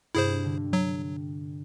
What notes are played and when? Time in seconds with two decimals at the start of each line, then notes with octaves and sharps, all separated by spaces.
0.15 G2 C3 E4 G#4 C5
0.44 D3
0.73 F#3